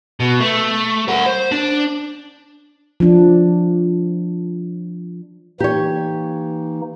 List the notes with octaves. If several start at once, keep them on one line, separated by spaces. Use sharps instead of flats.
B2
A3
A#4 F#5
C5
D4
F3 D4
E3 A#3 D#4 G4 C#5